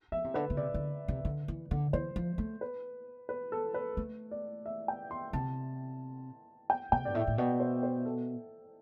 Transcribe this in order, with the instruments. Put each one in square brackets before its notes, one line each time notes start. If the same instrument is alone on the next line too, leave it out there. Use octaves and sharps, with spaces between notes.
[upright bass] F3 [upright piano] E5
[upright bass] C3
[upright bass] D3 [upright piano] B4
[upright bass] D3
[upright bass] C3 [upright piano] D5
[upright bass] D3
C3
D3
E3
D3
[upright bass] E3 [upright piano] C5
[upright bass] F3
A3
[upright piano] B4
B4
A4
B4
[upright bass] A3
[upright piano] D5
E5
G5
C6
[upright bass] C3 [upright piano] A5
[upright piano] G5
[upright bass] C3 [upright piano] G5
[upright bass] G2 [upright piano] D5
[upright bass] A2 [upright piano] E5
[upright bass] A2
[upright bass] B2 [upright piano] D5
[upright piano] C5
C5
A4